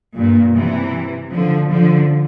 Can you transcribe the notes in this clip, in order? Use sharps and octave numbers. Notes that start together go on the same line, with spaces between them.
G2 A#2
C3 E3
D3 F3
D3 F3